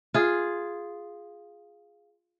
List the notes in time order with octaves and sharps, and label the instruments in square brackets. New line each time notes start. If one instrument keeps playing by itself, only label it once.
[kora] F4 G#4